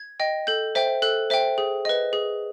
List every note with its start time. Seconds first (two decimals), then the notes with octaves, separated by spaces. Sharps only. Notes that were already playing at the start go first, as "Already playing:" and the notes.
Already playing: G#6
0.20 D#5 G5
0.47 A4 G6
0.75 C5 E5 G5
1.02 A4 F#6
1.30 C5 E5 G5
1.58 G#4
1.85 B4 D#5
2.13 G#4